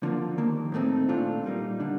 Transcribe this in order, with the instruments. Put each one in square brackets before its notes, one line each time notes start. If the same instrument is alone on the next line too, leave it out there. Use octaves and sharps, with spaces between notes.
[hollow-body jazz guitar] D3 F3 A#3
D#2 D#3 A#3
A2 A3 C4 D#4
A#2 A3 D4 F4
A#2 G3 A#3 D#4
D3 G3 D4